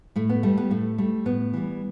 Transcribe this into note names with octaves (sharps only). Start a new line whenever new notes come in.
A2 A3
B3
G3 A3
B3
A2 A3
G3 A3
A2 B3
E3 G3